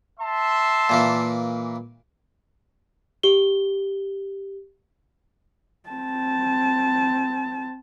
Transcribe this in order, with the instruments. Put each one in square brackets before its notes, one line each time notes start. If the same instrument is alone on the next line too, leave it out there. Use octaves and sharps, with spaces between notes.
[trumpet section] E5 A5 C6
[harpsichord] A#2 E3 A#3
[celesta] G4 G7
[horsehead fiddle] C4 A5